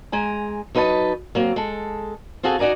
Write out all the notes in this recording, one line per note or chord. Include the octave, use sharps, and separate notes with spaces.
G#3 G#5 A#5
F#3 D#4 B4 D#5 A5
F#3 A#3 C4
G#3 A4
C4 F4 F#4 G#4 A4
D#4 F#4 D5 G#5 A#5